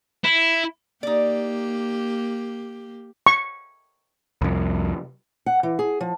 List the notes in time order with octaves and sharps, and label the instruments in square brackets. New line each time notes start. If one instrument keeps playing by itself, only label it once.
[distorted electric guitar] E4
[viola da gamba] A#3 G4 [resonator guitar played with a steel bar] D#4 D5
[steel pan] C#6
[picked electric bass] C2 F2
[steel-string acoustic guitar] F#5
E3
G#4
F3